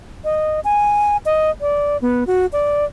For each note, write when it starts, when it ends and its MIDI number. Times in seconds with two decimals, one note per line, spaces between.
0.25 0.60 75
0.64 1.17 80
1.26 1.51 75
1.61 1.97 74
2.02 2.24 59
2.27 2.46 66
2.53 2.85 74